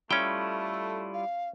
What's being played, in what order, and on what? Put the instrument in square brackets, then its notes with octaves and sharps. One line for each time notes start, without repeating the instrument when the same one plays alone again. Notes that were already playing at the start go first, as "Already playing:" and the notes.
[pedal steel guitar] G3 E4 F4 [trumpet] A3 [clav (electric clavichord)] C#4 G5
[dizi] A4
F5